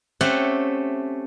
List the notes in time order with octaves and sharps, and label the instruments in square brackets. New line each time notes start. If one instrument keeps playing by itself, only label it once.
[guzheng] A3 C4 C#4 G4 E5 F#5